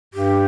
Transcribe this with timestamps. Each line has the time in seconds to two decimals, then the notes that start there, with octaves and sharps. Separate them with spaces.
0.14 G2 G4